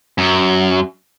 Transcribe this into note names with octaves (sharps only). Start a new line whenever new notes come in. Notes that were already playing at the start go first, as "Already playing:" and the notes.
F#2